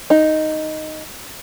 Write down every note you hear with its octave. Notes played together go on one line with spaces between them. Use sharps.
D#4